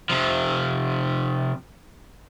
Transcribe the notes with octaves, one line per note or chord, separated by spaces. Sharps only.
C3 F3